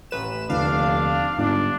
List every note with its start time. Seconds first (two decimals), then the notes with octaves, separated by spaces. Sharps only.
0.11 A1 B4 E7
0.50 F1 D#2 D3 D4 F5
1.38 G1 G#2 D4